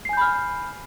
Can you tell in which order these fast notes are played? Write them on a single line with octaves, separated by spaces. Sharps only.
C7 G#5 G6 B5 F6